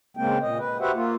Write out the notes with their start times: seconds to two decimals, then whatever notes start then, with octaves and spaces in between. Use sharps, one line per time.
0.17 C#3 G#3 A#3 C4 G5
0.41 A#2 D#5
0.58 B4
0.80 F#4 G4 B4 C5 E5 F#5
0.94 A#3 F4